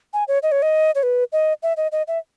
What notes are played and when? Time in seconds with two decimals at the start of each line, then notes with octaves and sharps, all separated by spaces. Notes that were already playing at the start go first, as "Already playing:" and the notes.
0.13 G#5
0.28 C#5
0.43 D#5
0.52 C#5
0.62 D#5
0.95 C#5
1.03 B4
1.32 D#5
1.63 E5
1.77 D#5
1.92 D#5
2.08 E5